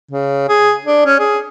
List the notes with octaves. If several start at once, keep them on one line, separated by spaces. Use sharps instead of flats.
C#3
G#4
D4
C#4
G#4